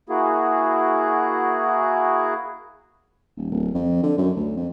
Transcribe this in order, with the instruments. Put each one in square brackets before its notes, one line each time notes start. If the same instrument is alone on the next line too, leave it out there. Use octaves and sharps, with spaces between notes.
[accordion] A#3 E4 F#4 G#4
[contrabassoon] D#1
D1
F2
D3
F#2
D2
F2